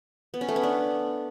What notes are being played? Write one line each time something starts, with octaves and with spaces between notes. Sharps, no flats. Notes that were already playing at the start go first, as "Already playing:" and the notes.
B3
C#4
A3
B3
D4